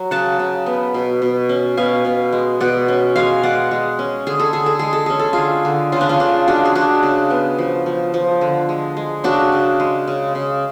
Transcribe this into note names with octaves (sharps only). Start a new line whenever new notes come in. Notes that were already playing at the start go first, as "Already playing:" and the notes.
Already playing: F#3
C#3 F#5 A5
C#3
B3
B2
B2
C#4
B2 F5 G#5
B2
G#3
B2 D5 F#5
C#4
G#3 F5 G#5
G#3 D5 F#5
G#3
C#4
D3 G#4
A4
D3 G#4
A4
G#3 G#4
A4
C#4 G#4
A4
D3 F4 G#4
D3
C#3 F4
D4
C#4 F4
C#3 D4
G#3 D4 F#4
G#4
G#3 D4 F#4
C#3
B3
F3
F3
F3
D3
G#3
G#3
C#3 D4 F#4
C#3
G#3
C#3
C#3